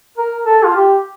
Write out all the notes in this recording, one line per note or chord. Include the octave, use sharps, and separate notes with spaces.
A#4
A4
F4
G4